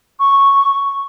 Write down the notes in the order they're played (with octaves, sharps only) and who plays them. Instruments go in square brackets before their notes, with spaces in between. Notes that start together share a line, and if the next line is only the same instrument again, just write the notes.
[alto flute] C#6